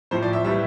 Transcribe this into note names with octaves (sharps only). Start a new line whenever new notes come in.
A2 F3 C5
D5
E5
A2 E3 G3 E5